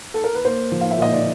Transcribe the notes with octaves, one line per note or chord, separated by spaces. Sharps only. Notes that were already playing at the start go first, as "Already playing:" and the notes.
A4
A#4
B4
A#3 C5
F3
F5
E5
A#2 D#5
D5